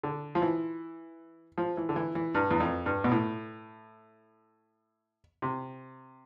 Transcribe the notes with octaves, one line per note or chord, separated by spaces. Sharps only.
D3
F3
E3
F3
E3
D3
E3
E3
G2
E2
F2
G2
B2
A2
C3